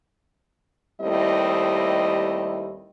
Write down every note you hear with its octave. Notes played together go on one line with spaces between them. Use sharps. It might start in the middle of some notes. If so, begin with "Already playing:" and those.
D#2 G3 A3 C4 E4 D#5